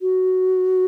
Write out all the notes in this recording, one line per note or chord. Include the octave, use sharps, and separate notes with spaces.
F#4